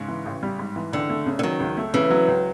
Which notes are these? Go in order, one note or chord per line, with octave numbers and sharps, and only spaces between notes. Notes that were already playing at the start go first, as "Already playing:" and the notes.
Already playing: G#2 C#3
E3
A1
G3
G#2
E3
C#2 D3
A3
C#3
D3
D#3 F#3
C#2
A3
C#3 E3
F#3
C#2